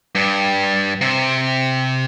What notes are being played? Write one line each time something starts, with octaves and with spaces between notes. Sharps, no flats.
G2
C3